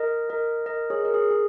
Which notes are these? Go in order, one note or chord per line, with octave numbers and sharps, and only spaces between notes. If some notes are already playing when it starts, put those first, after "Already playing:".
Already playing: A#4 D#5
A#4 D#5
A#4 D#5
G#4 C#5
A#4
G#4
G#4